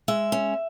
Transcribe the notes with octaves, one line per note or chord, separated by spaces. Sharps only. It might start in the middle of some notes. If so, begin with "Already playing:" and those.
G#3 E5
C#4